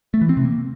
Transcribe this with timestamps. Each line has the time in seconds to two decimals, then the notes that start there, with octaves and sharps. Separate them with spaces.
0.14 A3
0.21 E3
0.29 C4
0.37 C3
0.45 A#3